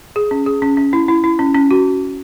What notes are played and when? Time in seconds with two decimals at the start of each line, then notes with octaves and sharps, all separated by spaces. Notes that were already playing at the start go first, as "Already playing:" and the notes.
0.16 G#4
0.31 C#4
0.46 G#4
0.62 C#4
0.77 C#4
0.93 E4
1.08 E4
1.24 E4
1.39 C#4
1.54 C#4
1.71 F#4